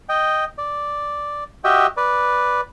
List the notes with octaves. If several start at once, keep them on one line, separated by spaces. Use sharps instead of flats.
D#5 G5
D5
F#4 G4 D#5 E5 G5
B4 D5